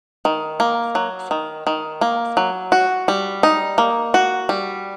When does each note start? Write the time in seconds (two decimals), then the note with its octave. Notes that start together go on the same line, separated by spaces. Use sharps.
0.25 D#3
0.60 A#3
0.95 F#3
1.31 D#3
1.67 D#3
2.01 A#3
2.37 F#3
2.72 F#4
3.08 G3
3.43 D#4
3.78 A#3
4.14 F#4
4.49 G3